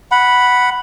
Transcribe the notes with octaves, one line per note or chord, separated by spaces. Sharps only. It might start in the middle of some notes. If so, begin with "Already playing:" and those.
F#5 B5